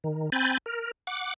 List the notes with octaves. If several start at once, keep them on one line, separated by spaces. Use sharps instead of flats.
D#3
C4 G#5 B5 G6 A6
A#4
F#5 D6